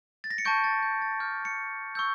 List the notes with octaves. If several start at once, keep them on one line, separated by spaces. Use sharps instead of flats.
A6
A#6
C#7
A5 C#6 G6 D7
A6
G6
A6
A5 D6 F6 G6
C#7
C#6 E6 G6